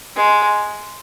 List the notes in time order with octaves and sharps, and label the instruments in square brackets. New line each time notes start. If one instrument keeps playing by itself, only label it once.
[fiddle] G#3